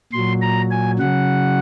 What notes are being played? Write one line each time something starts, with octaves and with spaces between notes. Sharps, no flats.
A#2 F#3 C6
A#5
G#5
C#3 F#3 F#5